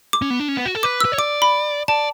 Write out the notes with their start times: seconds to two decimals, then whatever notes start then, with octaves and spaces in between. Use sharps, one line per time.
0.13 D6
0.22 C#4
0.30 B3
0.40 D4
0.48 C#4
0.57 B3
0.66 F#4
0.75 A4
0.83 B4 D6
1.01 B4 E6
1.12 C#5
1.18 D5 D6
1.42 B5
1.88 D5 A5